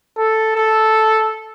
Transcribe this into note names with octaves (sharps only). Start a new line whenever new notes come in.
A4
A4